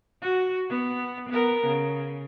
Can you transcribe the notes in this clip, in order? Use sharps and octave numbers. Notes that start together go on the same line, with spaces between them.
F#4
B3
B3 A#4
C#3